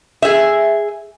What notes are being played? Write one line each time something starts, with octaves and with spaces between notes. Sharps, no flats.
G#4 E5